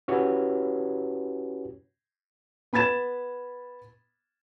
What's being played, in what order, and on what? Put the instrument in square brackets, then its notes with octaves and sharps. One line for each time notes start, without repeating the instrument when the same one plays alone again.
[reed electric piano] C#4 E4 F#4 G4 B4 C#5
[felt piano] B3 B5 G#6 A6 E7